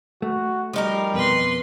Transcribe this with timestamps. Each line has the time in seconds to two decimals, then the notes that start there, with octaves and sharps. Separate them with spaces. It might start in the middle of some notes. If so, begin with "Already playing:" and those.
0.22 A3 F#4
0.73 F3 G3 D#4 A#4
1.14 F2 B2 B4 C6